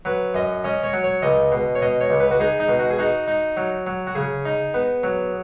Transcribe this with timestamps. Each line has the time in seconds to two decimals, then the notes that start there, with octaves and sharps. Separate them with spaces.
0.05 F#3 B4
0.34 F#2 D#5
0.64 C#4 D#5
0.84 C#5
0.93 F#3
1.04 C#5
1.22 C#2 D#5
1.52 B2
1.75 C#5
1.82 B2 D#5
2.01 C#5
2.10 C#2
2.20 B4
2.31 F#4
2.40 D#4 G#4
2.60 D#4
2.69 B2
2.79 F#4
2.90 G#4
2.99 D#4 F#4
3.28 D#4
3.57 F#3
3.87 F#3
4.07 F#4
4.15 C#3 G#4
4.45 D#4
4.74 B3
5.03 F#3